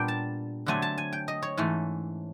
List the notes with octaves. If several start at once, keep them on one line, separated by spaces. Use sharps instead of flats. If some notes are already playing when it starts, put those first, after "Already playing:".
Already playing: A#2 G3 B3 D4 G5
A5
D3 F#3 A3 C4 G#5
A5
G#5
G5
D#5
C#5
G#2 E3 A3 C#4